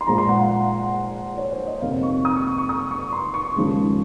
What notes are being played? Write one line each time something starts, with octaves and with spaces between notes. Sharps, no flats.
C6
A#1 A#2 F3 G#3 A#5
C6
F#5
F5
C#5
C5
D#5
F2 C3 D#3 A#3 F5
C#6
D#6
C#6
C#6
C#6
D#6
C#6
C6
C#6
D#2 C#3 F3 G#3